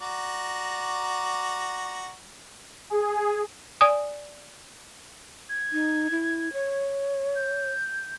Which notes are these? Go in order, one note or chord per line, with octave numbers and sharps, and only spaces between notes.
F#4 D5 A#5
G#4
D5 G#5 D#6
G#6
D#4
E4
C#5
G6